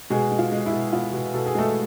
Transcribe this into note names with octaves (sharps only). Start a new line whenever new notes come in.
B2 G#3 G#4
G#3
F4
G#3
E4
B2
B3 F4
B2
B2 A4
G#4
G#3 A3 A4